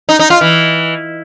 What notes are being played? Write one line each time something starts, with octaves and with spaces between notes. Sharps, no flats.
D#4
D#4
F4
E3